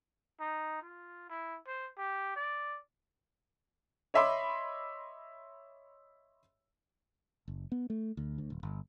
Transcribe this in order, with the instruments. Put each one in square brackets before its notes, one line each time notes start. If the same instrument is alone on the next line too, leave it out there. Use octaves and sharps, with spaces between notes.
[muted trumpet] D#4
F4
E4
C5
G4
D5
[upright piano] C#5 D#5 E5 B5 C6 D6
[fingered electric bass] F#1
B3
A3
D2
D2
D#1
G1